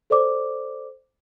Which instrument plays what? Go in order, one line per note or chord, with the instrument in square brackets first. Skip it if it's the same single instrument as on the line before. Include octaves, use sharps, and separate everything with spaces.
[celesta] A4 C5 D5 D6